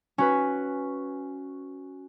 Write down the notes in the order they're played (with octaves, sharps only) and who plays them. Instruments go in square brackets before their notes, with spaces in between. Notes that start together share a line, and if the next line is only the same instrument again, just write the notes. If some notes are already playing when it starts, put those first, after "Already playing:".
[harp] C#4 F#4 B4